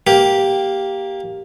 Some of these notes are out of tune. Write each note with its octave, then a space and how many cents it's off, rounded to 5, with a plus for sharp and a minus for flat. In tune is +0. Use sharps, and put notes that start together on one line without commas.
A#3 +0 G4 +0